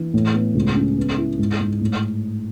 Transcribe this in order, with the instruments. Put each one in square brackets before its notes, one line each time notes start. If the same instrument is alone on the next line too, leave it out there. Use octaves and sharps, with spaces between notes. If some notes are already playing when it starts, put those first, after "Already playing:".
Already playing: [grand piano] E3
A2
B3
C#2
C#4
B3
E4
G#2
G#2
A2